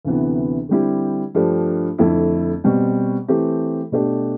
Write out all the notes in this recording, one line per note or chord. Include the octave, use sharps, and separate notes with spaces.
D2 C3 E3 B3
D3 G3 C4 E4 G4
G2 F3 A3 D4 G4
F2 D3 A3 E4 A4
B2 G3 C4
E3 A3 C4 G4
B2 A3 D4 G4